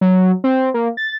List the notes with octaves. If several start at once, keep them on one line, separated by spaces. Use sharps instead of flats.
F#3
C4
A#3
A6